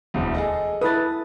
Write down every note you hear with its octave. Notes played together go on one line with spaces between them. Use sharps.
E1 D2
G#4 A4 D#5
E4 A4 B4 D#6 A6